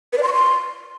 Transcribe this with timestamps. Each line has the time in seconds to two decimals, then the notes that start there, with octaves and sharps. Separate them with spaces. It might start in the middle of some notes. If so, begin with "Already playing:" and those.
0.13 B4
0.18 D5
0.23 C6
0.28 C#6
0.33 C6